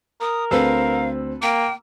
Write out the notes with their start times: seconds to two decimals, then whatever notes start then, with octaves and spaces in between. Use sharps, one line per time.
0.21 A#4 D#6
0.51 D2 C4 A4 B4 F5 E6
1.43 A#3 G5